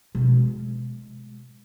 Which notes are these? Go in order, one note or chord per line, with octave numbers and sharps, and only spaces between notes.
B2 G#3